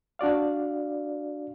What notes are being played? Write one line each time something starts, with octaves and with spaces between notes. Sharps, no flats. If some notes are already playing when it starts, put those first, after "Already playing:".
D4 F#4 D5 F5